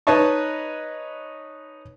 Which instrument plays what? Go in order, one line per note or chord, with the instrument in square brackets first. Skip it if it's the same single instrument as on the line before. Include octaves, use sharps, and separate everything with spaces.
[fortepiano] D#4 B4 C#5 D#5 A5 C#6